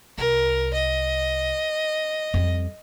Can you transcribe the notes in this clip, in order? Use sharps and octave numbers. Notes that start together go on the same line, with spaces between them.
C2 A#4
D#5
F2 G3